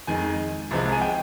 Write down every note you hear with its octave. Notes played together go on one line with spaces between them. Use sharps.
F2 D#3 G#3 G#5
C2 C3 F3 G#3
G#5
G5